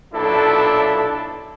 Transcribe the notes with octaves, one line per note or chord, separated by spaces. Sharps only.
B1 A#2 D4 E4 A4